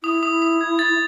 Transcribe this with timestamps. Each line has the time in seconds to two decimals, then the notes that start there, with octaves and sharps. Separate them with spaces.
0.04 E4 D#6
0.23 D#6
0.42 D#6
0.61 G#6
0.79 A6